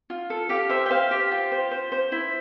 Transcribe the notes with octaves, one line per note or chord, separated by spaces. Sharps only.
F4
A4
G4 F5
C5 E5
G5
C5 F5
G4
F4
C5
C5
C5
E4